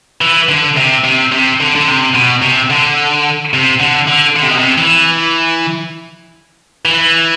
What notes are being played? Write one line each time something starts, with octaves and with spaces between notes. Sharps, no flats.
E3
D3
C3
C3
C3
D3
D3
C3
B2
C3
D3
C3
D3
D3
D3
C3
B2
C3
E3
E3